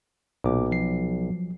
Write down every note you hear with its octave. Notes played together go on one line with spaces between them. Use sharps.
B1 A#2 F#3 D6
F3 F#3 C7